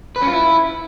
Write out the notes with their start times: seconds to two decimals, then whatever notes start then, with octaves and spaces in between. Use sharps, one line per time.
0.16 B4
0.22 C#4
0.27 F4
0.33 E4